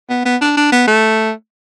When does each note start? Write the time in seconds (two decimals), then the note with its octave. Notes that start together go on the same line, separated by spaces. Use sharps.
0.10 B3
0.25 B3
0.41 D4
0.57 D4
0.72 B3
0.88 A3